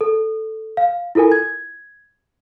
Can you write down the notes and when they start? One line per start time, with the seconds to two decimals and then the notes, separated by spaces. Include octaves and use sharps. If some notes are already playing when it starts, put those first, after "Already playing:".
0.01 A4
0.77 F5
1.15 E4 F4 A4 A#4 G#5
1.32 G#6